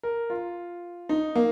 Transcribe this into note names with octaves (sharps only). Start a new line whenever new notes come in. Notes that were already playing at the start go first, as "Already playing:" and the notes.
A#4
F4
D#4
A#3